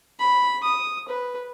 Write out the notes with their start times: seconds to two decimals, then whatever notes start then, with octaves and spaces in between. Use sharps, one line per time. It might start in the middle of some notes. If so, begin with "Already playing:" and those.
0.19 B5
0.64 D#6
1.09 B4